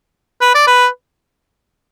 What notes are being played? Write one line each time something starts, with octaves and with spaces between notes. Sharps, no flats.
B4
D5
B4